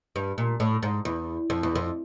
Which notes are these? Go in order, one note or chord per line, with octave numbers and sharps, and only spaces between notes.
G2
A#2
A2
G#2
E2
F2
E2
F2